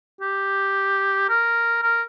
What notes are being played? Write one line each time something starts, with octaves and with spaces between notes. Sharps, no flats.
G4
A#4
A#4